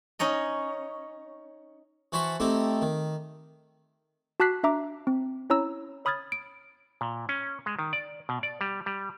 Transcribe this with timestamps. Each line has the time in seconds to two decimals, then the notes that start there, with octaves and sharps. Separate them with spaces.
0.19 C#4 D#4 C#5 D#5
2.12 E3 F#4 C5 A5 B5 C#6
2.40 A3 C4 D#4 E4 G4 A4
2.82 D#3
4.40 F#4 A5 D6 F#6 B6 C7
4.63 D4 E5 A#5 D6
5.07 C4
5.50 C#4 E4 C#5 A#5 B5 E6
6.05 C#5 B5 D#6 F6 G#6 A6
6.32 D7
7.01 A#2
7.29 C#4
7.66 G#3
7.79 D#3
7.93 D5
8.29 B2
8.43 D5
8.61 G3
8.86 G3